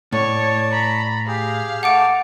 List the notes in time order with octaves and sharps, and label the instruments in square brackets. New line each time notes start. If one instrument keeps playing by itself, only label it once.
[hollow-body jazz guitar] A2 [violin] C#5 [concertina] D5 A5
[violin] A#5 B5
[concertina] G4 G#4 [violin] F5
[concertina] A3 A5 [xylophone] F#5 D6 D7